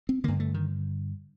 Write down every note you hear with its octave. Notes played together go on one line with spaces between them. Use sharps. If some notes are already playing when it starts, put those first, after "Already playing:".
C4
G2 D3 A#3
A3
D#3